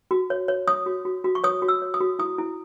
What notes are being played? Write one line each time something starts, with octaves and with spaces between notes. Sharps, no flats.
F#4
C#5
C#5
C#5 D#6
F#4
F#4
F#4
C#6
C#5 D#6
F#4
E6
C#5
D#6
F#4
E4 D#6
E4